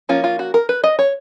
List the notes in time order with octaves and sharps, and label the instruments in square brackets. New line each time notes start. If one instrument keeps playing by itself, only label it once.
[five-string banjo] F3 A#3 C#4 F4
F4
F#4
A#4
B4
D#5
C#5